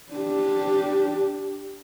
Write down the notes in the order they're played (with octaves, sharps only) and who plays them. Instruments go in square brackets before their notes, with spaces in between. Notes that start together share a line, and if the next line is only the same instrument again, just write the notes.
[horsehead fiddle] D4 G4